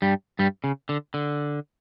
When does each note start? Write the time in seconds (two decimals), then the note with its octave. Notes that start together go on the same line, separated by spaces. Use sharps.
0.02 G2 G3
0.39 G2 G3
0.64 C#3
0.89 D3
1.14 D3